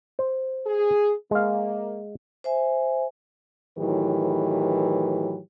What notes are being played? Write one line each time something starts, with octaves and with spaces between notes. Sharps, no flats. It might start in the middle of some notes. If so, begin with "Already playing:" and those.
C5
G#4
G#3 A#3 F5
C5 E5 G#5
A2 D#3 E3 F#3 G4 B4